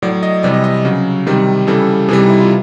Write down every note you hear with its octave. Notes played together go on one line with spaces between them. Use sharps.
A2 F#3 D5
D#5
C3 E3 G3 D5
D#5
D#5
C#3 F#3
C3 D#3 G3
C#3 E3 G3 A4
C3 E3 G3 G#4
D#4
E4
F4